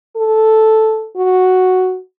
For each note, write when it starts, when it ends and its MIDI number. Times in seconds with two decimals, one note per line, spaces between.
0.16 1.08 69
1.16 1.97 66